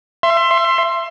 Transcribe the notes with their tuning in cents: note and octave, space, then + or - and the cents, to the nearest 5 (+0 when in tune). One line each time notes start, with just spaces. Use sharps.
E5 +30 C6 +10